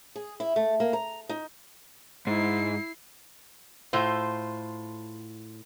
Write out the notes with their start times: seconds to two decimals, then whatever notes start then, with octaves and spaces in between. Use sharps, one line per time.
0.16 G#4
0.40 E4
0.56 A3
0.80 A#3
0.93 A#5
1.29 D#4
2.27 G#2 E4 C7
3.93 A2 F4 C5